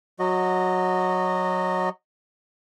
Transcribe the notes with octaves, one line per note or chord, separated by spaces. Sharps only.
F#3 F#4 D#5